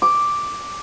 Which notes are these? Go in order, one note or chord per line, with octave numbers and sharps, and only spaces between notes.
D6